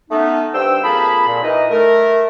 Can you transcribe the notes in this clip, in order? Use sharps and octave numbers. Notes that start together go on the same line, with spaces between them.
A3 B3 C#4 D#4
G2 C5 G5 E6
F2 A#3 G#4 A5 B5
A#2
E3 D#4 A#4 D#5
A3 A#4